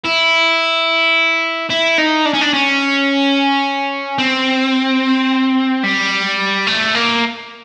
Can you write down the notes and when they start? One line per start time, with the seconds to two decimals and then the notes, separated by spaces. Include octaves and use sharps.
0.05 E4
1.70 E4
1.98 D#4
2.25 D4
2.34 C#4
2.41 D4
2.54 C#4
4.18 C4
5.84 G3
6.67 A3
6.95 A#3